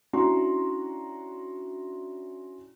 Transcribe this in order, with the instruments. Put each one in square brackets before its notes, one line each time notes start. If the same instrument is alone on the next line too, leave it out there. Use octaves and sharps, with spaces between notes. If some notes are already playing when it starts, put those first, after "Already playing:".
[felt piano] C#4 D4 E4 F#4 A#5 C6